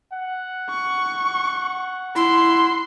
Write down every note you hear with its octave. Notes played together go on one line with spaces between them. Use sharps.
F#5
C#6
E4 C6